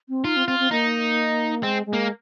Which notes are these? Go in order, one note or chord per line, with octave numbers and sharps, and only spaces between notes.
C4
D#4 F4
C4
C4 F4
C4
A#3 D#4
G#3 C4
G#3
A#3